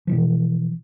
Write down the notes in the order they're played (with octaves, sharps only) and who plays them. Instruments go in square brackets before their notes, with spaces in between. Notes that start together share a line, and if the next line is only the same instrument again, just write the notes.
[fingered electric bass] B2 E3 F3